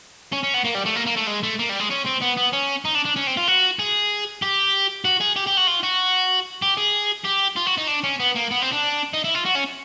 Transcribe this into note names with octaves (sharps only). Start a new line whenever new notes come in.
C#4
C#4
B3
A#3
G3
A3
A#3
A#3
A3
G#3
A3
A#3
G3
G#3
C#4
C4
B3
B3
C#4
D#4
D4
D4
C#4
C4
F4
F#4
G#4
G4
F#4
G#4
G4
G4
F#4
F4
F#4
G4
G#4
G4
F4
F#4
D#4
D4
C#4
B3
A#3
B3
C4
D4
D#4
E4
F4
F#4
C#4